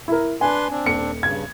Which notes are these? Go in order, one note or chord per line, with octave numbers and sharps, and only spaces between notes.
E4 A#4
D4 B4 G#5 C6
C4 D4
D#1 C#7
G2 C#3 G#6